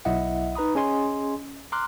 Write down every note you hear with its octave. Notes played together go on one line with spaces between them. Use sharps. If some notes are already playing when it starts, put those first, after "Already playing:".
B1 E4 D#5 E5 F#5
D#4 B4 A#5 B5 D#6
C#4 G#4 D#5 G#5 C6
A#5 C6 D6 F6 F#6